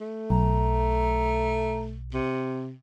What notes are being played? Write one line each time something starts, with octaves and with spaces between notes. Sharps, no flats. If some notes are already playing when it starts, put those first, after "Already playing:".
A3
B1 A#5
C3